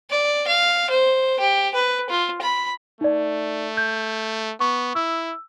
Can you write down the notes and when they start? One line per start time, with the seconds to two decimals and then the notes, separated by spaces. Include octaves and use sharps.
0.10 D5
0.47 F5
0.90 C5
1.39 G4
1.74 B4
2.09 F4
2.41 B5
3.01 A3 D#4 D5
3.77 G6
4.60 B3 C#6
4.95 E4 E6